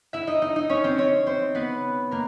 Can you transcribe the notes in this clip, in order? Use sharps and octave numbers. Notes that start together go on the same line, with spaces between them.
E4 E5
D#4 D#5
D#4 D#5
D#4 D#5
C#4 C#5
C4 C5
C#4 C#5
C4 C5
B3 B4
A#3 A#4